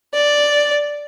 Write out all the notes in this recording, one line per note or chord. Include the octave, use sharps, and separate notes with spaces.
D5